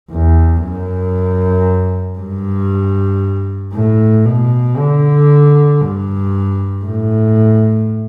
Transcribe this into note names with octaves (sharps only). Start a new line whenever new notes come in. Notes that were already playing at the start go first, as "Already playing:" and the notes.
E2
F#2
G2
A2
B2
D3
G2
A2